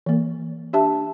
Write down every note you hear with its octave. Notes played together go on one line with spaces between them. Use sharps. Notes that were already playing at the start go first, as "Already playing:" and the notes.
E3 A#3
D4 G4 E5 A5